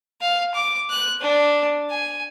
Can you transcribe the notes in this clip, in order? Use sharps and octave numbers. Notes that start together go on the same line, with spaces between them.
F5
D6
F#6
D4
G#5